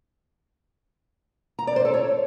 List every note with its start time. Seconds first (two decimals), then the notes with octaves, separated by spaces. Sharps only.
1.59 A#5
1.67 D5
1.76 C5
1.85 A4
1.94 C#5